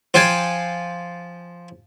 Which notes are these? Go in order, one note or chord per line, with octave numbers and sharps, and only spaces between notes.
F3 F4 G5 G#5